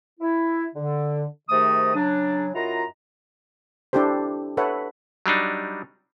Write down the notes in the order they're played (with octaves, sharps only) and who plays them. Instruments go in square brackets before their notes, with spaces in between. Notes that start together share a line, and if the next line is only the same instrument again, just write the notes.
[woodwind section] E4
D3
G#2 C3 D#3 A3 D#5 D#6
C#3 F#3 D4
F#2 E4 F4 D#5 F#5 A#5
[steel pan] D4 E4 G4 A4 C5
A4 B4 C#5 E5 F#5
[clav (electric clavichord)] F#3 G3 D4 D#4